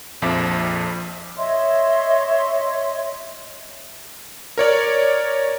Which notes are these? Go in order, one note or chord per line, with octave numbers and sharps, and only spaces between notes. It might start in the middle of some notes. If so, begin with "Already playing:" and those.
A#1 F2 F3 E5 D6 B6
C#5 D#5 E5 C6
A#4 C#5 D5